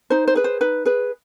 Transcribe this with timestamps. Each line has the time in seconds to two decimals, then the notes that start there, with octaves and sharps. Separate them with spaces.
0.10 D#4 C5
0.27 C5
0.35 G#4 B4
0.44 C5
0.61 D#4 B4
0.85 G#4 B4